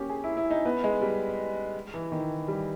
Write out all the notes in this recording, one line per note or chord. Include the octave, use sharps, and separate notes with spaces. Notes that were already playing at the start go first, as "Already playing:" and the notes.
Already playing: A#3 C#4 G4
G#4
E4
E4
D#4
B3
G#3
G3
E3
D#3
G3